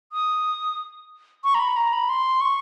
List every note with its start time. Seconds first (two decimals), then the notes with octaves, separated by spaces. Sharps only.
0.12 D#6
1.44 C#6
1.55 A#5
1.59 B5
1.76 A#5
1.93 B5
2.09 C6
2.41 C#6